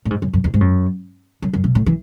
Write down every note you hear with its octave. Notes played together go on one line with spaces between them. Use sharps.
A2
G#2
F#2
F#2
E2
G#2
F#2
F#2
F#2
B2
A2
E3